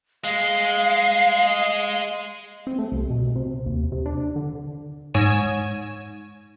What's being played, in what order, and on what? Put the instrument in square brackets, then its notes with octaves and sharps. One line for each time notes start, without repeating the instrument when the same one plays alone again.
[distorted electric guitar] G#3 [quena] F5
[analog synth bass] C4
A3
C2
B2
C3
D#2
C3
D4
D3
[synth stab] G#2 C#5 G#5 G#6 E7